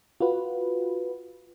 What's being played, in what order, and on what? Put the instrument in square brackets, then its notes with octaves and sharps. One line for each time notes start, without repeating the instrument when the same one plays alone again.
[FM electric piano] F4 F#4 B4